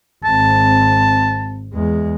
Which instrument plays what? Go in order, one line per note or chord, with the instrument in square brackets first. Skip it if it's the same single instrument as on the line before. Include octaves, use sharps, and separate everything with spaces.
[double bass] G#1 C4 [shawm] A5
[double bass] E2 G#3